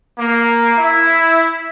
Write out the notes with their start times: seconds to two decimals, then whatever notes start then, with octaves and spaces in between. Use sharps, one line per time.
0.19 A#3
0.79 E4